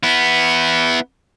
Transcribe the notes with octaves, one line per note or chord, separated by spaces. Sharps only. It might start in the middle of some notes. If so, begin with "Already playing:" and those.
B3 E4